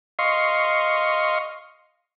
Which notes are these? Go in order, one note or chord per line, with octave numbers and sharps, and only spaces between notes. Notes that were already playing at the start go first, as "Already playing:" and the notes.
D#5 F5 C6 C#6